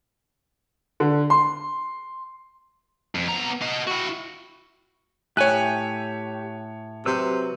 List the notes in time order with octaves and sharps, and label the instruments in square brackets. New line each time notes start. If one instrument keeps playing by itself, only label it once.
[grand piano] D3
C6
[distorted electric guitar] F2
B3 A#5
F#4 D#5
E4 F#4
[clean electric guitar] A2 G#5 [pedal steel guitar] G4 E5 [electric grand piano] C#5 F#6
[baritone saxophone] C3 [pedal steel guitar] F#3 B4 E6